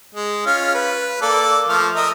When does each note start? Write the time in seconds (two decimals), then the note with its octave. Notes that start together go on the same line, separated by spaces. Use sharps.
0.15 G#3
0.46 C#4 F4 F6
0.75 B4
1.22 A#3 A4 D5
1.69 F3 A3 F6
1.96 A#4 D#5 E5